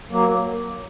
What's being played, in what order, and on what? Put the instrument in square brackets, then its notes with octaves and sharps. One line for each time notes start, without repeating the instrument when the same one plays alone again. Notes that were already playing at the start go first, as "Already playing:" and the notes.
[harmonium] F#3 A#3